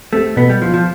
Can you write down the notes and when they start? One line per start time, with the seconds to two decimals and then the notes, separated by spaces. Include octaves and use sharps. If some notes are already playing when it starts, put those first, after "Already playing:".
0.13 A3 C4 G4
0.36 B2 B3
0.49 G3
0.62 F3 B3 F4
0.74 F3